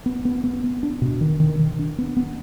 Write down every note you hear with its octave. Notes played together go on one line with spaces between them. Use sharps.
B3
B3
B3
B3
D4
B2
D#3
D#3
D#3
D4
B3
B3